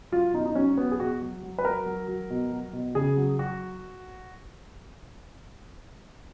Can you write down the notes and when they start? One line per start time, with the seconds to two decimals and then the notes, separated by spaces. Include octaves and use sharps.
0.12 F#3 F4
0.34 B2 D#4
0.46 D#4
0.55 F#3 C#4
0.77 F#3 B3
0.91 G#4
0.99 B2 F#4
1.22 F#3
1.43 F#3
1.58 B4
1.65 F#3 A#4
1.86 F#3
2.08 F#3
2.30 B2
2.52 F#3
2.73 B2
2.95 C#3 G#4
3.17 F#3
3.39 F#3 F#4